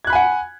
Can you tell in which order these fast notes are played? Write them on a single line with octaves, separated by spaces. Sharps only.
G#6 F#6 B5 G#5 F#5